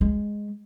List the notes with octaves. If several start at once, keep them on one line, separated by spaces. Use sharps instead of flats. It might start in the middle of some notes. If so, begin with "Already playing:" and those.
G#3